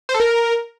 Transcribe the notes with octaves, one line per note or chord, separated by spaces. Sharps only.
C5
A4
A#4